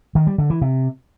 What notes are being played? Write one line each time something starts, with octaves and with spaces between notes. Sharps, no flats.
D#3
G3
D3
E3
C3